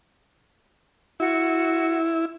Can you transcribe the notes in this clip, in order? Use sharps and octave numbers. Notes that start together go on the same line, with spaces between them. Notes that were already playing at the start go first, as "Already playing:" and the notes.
E4 F#4